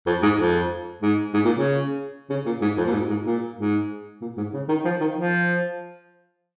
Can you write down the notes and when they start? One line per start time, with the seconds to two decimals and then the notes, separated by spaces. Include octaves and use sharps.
0.07 F2
0.22 G#2
0.39 F2
1.02 G#2
1.34 G#2
1.45 A#2
1.55 C#3
2.30 C#3
2.46 A#2
2.62 G#2
2.77 F2
2.86 A#2
2.93 G#2
3.10 G#2
3.26 A#2
3.58 G#2
4.21 A#2
4.37 G#2
4.54 C#3
4.69 D#3
4.85 F3
5.01 D#3
5.17 F3